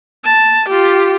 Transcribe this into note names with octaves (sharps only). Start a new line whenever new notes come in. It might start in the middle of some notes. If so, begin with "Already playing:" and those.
A5
F4 G4